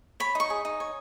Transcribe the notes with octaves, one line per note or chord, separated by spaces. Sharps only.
C#5 B5
D#4 C#6
G#4
D#4
C#5